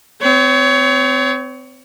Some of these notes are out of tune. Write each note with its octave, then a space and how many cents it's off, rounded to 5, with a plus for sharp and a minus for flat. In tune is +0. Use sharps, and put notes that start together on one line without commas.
C4 -30 C#5 +20